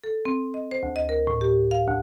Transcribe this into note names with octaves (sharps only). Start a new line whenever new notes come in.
A4
C4
D#5
C5
D2
D#5
A#4
A2
G4
F5
D2